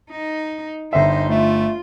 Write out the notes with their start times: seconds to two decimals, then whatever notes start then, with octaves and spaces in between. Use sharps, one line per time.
0.11 D#4
0.93 G1 D#4 C5 E5
1.29 A3 F4